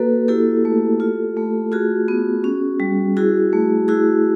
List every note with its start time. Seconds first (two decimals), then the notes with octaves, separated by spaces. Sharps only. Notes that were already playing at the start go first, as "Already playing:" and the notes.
Already playing: A#3 F#4 A4 B4
0.28 E4 G4 A4
0.65 A3
1.00 F4
1.37 A3
1.72 F4 F#4 G#4
2.08 B3
2.44 C#4
2.80 G3
3.17 E4 F#4 G#4
3.53 A3
3.88 E4 F#4 G#4